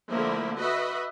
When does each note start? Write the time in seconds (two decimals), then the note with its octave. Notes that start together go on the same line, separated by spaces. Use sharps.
0.11 D3 F3 A3 A#3 E4
0.58 F#4 B4 D#5 E5